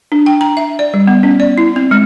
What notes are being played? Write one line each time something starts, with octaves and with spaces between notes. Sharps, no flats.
D4
G5
A#5
E5
D5
G3
B3
C#4
D5
E4
C4
G#3